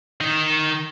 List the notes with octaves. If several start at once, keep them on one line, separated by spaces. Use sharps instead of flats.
D#3 D#4